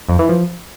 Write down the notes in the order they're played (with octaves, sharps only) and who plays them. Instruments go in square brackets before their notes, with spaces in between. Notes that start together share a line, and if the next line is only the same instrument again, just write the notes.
[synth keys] F2
E3
F3